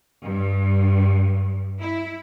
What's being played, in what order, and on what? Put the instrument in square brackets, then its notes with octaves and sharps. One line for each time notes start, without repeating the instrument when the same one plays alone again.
[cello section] G2
E4